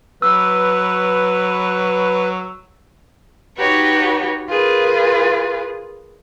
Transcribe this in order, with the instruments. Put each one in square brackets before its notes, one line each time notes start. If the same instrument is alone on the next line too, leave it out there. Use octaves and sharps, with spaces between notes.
[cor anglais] F#3 [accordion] B4 [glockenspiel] E6
[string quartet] D#4 F#4 G4 B4 C#5
F4 G#4 A#4 B4